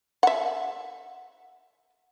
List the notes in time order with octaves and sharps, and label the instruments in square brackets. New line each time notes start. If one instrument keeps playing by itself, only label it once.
[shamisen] E5 F#5